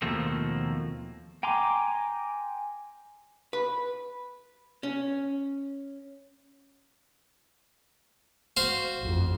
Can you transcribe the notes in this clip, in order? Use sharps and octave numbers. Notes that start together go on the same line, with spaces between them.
D#2 B2 F3 A3 A#3 C4
G5 G#5 A#5 C6 D6
B4
C#4
F#4 C5 F5
A1 F2